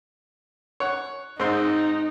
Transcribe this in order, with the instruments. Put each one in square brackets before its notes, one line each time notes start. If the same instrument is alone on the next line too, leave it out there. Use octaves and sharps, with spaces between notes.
[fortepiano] C#5 F#5
[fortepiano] G#2 C4 C6 [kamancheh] D#4